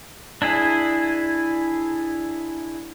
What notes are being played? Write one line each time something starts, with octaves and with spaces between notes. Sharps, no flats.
D4 E4 G#4